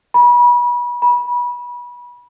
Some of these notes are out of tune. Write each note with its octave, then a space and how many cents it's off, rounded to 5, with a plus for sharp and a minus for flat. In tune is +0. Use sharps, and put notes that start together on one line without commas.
B5 -30
B5 -25